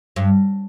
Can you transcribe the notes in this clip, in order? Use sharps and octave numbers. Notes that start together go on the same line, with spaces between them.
G2